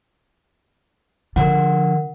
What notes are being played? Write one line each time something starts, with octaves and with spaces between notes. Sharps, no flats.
D3 F3 A#4 F#5